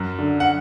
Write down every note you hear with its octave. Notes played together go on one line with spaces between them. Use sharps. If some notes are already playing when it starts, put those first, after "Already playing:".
Already playing: F#2
D3
F#5